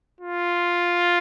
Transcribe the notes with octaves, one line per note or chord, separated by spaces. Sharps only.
F4